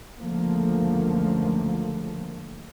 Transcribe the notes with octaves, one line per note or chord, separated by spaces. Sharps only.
C#2 F#2 D3 F3 A3 A#3